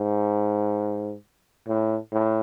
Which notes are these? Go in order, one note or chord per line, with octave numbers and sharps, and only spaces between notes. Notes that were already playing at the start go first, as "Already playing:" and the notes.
Already playing: G#2
A2
A2